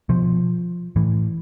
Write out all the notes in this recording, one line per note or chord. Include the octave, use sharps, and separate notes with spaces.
B2 F3
A2 E3